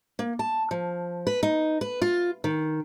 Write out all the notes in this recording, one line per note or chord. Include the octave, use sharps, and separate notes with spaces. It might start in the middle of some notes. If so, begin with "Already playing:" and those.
A#3
A5
F3
B4
D#4
B4
F4
D#3